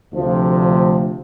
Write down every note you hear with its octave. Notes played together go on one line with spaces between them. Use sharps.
D2 C3 F3